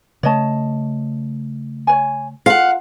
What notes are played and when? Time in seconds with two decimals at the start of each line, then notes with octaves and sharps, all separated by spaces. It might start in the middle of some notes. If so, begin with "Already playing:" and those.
0.23 C#3 A3 C#5 D#5 A5
1.87 C#5 G#5
2.46 F4 F5 F#5